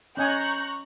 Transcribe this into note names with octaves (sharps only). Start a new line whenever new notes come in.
C#4 D#5 G#5 A#5 C#6 F#6 G6